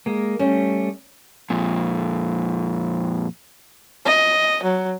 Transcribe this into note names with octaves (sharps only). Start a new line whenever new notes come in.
G#3 A#3
G3 A3 C#4
F2 A#2
D#5
F#3